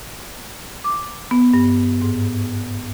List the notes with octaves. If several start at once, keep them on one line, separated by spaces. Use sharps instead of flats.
D6
B3
G2
G#2